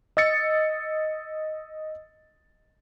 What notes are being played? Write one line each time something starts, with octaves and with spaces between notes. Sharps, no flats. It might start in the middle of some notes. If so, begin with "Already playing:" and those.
D#5 E6 A6 C#7